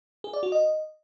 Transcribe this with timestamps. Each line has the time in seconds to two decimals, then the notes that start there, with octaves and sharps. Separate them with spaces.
0.24 G#4
0.33 D5
0.43 F#4
0.52 D#5